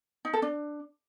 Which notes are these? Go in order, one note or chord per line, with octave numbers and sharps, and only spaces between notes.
D#4
A4
D4